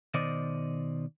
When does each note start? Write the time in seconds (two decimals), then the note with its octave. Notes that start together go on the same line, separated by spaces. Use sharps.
0.14 B2 D#3 C5 D5 D#5